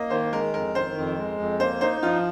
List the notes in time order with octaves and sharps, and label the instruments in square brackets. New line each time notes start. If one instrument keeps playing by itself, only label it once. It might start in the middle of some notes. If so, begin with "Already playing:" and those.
Already playing: [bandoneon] A#3 [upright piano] D#5
[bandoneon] D#3 [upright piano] C5
[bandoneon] G#3 [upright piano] A#4
[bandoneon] F2 [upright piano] A#4
[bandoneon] D#3 [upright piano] C5
[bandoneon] F2
G#3
F2
[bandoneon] A#3 [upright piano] C5
[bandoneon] D#4 [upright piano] C5
[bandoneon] F3 [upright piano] F4